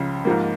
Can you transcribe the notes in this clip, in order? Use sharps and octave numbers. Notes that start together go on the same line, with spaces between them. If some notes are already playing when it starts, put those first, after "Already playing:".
Already playing: C#2 C#3 F3 F4
G#2 F3 A#3